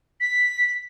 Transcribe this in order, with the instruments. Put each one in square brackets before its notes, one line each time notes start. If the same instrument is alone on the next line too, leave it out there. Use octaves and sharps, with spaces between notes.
[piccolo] B6